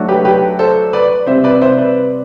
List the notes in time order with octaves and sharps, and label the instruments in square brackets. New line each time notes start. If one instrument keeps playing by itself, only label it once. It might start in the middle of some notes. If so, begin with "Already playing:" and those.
Already playing: [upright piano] F#3 A3 D4 F#4
[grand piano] G4 B4
G4 B4
A4 C5
B4 D5
[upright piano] C3 G3 C4 [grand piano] C5 E5
[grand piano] B4 D5
C5 E5
B4 D5